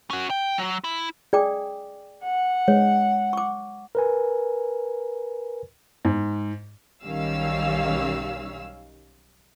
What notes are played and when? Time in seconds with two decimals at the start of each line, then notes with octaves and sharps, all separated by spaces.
0.10 C#4 F#4
0.30 G5
0.58 F#3
0.84 E4
1.33 G#4 D5 G5 D6
2.23 F#5
2.68 G#3 C#5
3.33 C#6 D6
3.95 A#4 B4 G#5
6.05 G#2
7.04 B1 D#3 G3 C#4 F5 E6